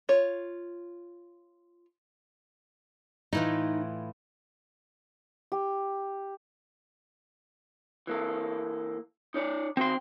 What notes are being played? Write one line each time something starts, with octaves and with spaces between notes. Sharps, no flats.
F4 C#5
A2 E3 D#4 F4
G4
E3 A#3 A4
D#4 C#5 D5
D#3 C4 F#4 C6